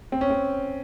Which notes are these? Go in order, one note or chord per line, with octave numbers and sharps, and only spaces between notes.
C4
C#4
C4